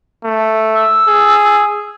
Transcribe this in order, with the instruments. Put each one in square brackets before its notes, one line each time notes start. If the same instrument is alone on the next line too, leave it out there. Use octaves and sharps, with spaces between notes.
[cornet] A3
[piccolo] E6
[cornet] G#4